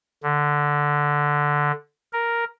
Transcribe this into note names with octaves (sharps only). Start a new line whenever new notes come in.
D3
A#4